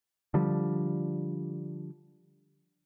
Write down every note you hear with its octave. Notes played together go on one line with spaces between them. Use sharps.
D3 F3 G3